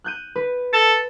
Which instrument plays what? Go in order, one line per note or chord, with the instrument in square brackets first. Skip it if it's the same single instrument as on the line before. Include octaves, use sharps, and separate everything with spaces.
[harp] F#6 G6 D#7
B4
[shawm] A4